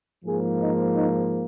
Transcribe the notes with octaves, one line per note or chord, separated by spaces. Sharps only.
G#2 F3 A#3 G#4
D#4
D#4